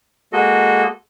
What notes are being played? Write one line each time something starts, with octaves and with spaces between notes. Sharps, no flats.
G#3 A#3 F#4 A4 D#5